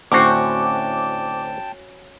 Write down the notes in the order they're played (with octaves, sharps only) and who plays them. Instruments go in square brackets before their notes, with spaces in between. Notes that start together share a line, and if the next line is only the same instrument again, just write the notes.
[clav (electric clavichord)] D2 A2 C4 [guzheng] C#4 F#4 [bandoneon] G5 A5 [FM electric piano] D6